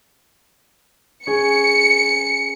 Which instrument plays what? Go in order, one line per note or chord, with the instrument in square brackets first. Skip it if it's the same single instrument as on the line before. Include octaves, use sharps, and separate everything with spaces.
[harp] C#4 G#4 G#5 [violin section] C#7